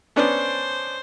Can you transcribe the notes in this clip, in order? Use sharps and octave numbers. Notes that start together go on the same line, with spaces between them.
B3 C#4 D4 C5